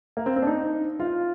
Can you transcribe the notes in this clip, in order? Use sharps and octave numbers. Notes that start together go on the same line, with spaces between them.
A#3
C4
C4
D4
D#4
F4